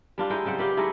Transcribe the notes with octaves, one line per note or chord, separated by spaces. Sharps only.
G3 D4 F4
G#3 D#4 E4 G5
C#3 G3 C4 F#5
F4 G4 B4 D5
G#3 A3 D#4 E4